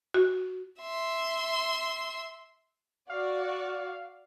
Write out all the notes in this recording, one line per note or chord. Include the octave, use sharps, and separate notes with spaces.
F#4
E5 C6
F#4 D5 F5